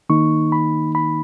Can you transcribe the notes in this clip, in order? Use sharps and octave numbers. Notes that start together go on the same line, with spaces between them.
D#3 A#3 D#4 C#6
B5
B5